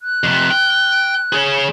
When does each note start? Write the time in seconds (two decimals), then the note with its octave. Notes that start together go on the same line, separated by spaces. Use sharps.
0.01 F#6
0.24 F2 C3
0.50 G5
1.32 G#4 C#5